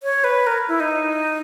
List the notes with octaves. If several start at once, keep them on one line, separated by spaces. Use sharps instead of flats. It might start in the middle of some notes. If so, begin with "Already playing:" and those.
C#5
B4
A#4
E4
D#4